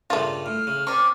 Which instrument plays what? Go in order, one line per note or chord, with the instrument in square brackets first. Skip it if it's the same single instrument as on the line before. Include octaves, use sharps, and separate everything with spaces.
[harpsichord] G2 A#2 C#3 [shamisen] A3 F4
[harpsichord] A2 [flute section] F6
[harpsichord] C#3
[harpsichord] C4 C#4 [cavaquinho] D5 C#6